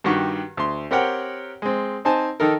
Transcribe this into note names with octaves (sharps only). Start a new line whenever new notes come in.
G2 D#3 F#4 G4 F#5 C#6
D2 C6
C4 G4 A#4 C#5 F#5 G5
G#3 C4
C4 D#4 C5 G#5 A5
D#3 D#4 A4 A#4